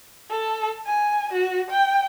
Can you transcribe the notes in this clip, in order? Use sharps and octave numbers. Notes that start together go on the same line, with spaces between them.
A4
G#5
F#4
G5